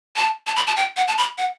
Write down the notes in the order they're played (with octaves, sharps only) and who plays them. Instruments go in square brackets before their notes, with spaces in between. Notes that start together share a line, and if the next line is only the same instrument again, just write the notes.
[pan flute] A5
A5
B5
A5
G5
F#5
A5
B5
F#5